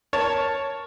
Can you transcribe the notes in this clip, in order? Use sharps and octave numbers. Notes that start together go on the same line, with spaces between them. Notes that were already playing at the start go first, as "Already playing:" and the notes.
A#4 C#5 A5